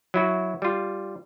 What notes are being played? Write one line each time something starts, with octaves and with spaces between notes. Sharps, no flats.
F#3 E4 F#4
G3 F4